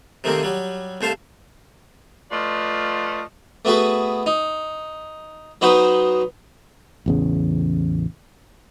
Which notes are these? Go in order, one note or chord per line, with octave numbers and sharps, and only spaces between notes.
C3 D#3 A3 A#3 C4
F#3 G3
C2 A3 C5 F5 A5
F3 A3 F4 B4 D5 D#5
A3 B3 F#4 G#4 B4
D#4
F#3 B3 D#4 F#4 B4 C5
A1 E2 C#3